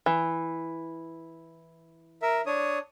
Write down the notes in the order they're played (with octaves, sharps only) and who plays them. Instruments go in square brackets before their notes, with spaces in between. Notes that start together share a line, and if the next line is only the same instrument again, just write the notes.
[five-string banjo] E3
[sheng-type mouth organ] A#4 E5
D4 C#5 D#6